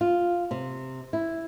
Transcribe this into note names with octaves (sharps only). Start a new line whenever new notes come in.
F4
C3
E4